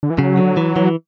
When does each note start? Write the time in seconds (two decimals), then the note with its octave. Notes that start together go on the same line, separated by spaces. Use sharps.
0.03 D3
0.10 E3
0.19 C#3 F#3
0.37 D3
0.57 E3
0.76 E3